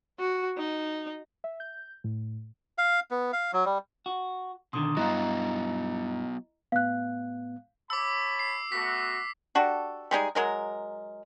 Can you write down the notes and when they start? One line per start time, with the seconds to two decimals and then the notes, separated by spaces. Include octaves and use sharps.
0.19 F#4
0.58 D#4
1.44 E5
1.60 G6
2.04 A2
2.78 F5
3.11 B3
3.33 F5
3.53 F#3
3.66 G3
4.06 F#4
4.73 B2 D3 D#3 C6 D#6
4.97 G2 F#3 B3 E4 D#5 F5 A#5
6.72 A2 B3 F5 F#6
7.90 C#5 A5 B5 D6 E6
8.39 C7
8.72 A3 B3 F#4 B6
9.55 D4 F#4 G4 A4
10.11 G3 G#3 D#4 G#4
10.35 F#3 G#3 A#4